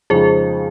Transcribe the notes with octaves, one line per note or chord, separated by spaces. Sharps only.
F2 C#3 F3 G#3 D#4 G#4 C5